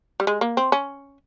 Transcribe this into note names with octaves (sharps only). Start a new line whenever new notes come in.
G3
G#3
A#3
C4
C#4